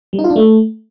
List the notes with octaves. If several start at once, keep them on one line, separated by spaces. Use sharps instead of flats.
G3
D#4
F4
D4
A3